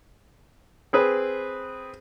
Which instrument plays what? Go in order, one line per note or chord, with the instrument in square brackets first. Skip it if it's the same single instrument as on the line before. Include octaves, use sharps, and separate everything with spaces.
[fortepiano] C4 G#4 B4